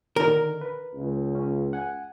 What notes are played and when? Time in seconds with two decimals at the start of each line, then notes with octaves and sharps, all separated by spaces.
0.16 D3 D#3 A#4
0.61 B4
0.95 C#2
1.35 C#4
1.73 F#5 G#5